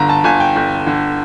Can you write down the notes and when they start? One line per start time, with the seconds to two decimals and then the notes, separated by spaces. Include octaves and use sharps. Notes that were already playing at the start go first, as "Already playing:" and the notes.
Already playing: G1 D3 A#5
0.09 A5
0.24 G1 G#5
0.40 G5
0.56 G1
0.87 D3